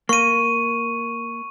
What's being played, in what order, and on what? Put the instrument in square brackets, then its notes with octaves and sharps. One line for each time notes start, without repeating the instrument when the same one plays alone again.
[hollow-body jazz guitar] A#3 [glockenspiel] C#6 D#7